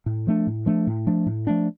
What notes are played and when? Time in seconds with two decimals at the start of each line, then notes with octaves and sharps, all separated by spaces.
0.06 A2
0.27 F3 A3 D4
0.47 A2
0.66 F3 A3 D4
0.87 A2
1.07 F3 A3 D4
1.26 A2
1.47 F3 A3 D4